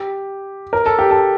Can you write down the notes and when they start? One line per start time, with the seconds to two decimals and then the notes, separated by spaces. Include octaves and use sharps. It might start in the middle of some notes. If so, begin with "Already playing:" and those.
Already playing: G4
0.73 A#4
0.86 A4
0.99 G4
1.11 A4